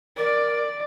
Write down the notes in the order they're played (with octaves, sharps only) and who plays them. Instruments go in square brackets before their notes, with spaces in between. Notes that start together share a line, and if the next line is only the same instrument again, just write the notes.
[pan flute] A#4 [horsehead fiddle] D5